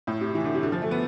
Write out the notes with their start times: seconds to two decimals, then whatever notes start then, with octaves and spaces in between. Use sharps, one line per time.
0.07 A2
0.21 C3
0.35 E3
0.44 D3
0.54 C3
0.63 D3
0.72 F3
0.82 A3
0.91 B3